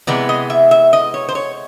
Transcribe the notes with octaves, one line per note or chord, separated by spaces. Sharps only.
C3 E3 G#3 B3 D5
D#5
E5
E5
D#5
C#5
C5
C#5